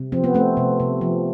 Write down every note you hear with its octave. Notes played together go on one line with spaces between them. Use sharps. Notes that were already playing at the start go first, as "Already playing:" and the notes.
Already playing: C3
F3 C4
B3
A3 C4
C3
C3
F3